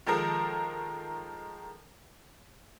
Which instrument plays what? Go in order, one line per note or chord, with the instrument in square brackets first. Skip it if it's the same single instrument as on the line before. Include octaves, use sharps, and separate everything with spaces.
[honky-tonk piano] D#3 F3 G#3 A4 A#4